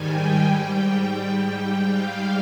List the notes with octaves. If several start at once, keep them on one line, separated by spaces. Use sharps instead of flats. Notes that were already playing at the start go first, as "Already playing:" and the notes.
Already playing: G#2 D#3 G3 G5 G#5
G#2 G3 G5
G#2 G3 G5
F5